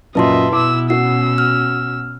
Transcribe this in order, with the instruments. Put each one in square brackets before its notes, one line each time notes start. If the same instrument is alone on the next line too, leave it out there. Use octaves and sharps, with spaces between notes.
[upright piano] F#2 A#2 [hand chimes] B4 A5 C6 [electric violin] D#5 E5
[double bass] B2 [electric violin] E4 E6 [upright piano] D6
[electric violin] C#4 E6 [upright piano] F#4 [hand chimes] C7
[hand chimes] F6